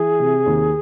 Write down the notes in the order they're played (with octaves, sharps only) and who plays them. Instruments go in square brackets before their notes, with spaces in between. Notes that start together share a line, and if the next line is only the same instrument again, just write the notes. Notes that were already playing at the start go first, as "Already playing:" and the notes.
Already playing: [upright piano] E3 [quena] G#4
[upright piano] C3
D#2